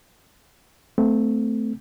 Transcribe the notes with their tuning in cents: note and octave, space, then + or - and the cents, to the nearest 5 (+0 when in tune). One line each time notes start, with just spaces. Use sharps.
A3 +0 C4 -25